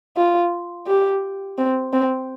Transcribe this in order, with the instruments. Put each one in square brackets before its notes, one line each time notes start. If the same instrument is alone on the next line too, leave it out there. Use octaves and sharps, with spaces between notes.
[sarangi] F4
G4
C4
C4